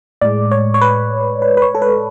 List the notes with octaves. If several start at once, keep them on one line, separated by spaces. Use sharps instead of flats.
A2 G#3 D5
C#5
C#5
B4
B4
B4
C#5
A4
B4